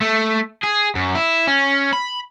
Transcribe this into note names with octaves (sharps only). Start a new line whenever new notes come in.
A3
G#4
F#2
E4
C#4
B5